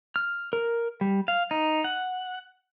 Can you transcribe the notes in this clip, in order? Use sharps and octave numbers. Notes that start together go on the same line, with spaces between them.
F6
A#4
G3
F5
D#4
F#5